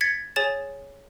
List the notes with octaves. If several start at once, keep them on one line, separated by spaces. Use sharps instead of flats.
G#6 A6 B6 C#7
G#4 C#5 G#5 A6 E7